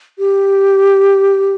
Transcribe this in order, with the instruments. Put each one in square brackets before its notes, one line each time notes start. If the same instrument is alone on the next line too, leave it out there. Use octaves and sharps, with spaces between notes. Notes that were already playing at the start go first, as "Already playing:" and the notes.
[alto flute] G4